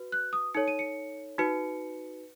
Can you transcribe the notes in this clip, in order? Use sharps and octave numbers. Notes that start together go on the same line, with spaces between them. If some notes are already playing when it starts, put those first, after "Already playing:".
Already playing: F#4 B4
F#6
D#6
D#4 A4 C#5 C#7
D#7
C#7
D#4 F#4 B4 C#7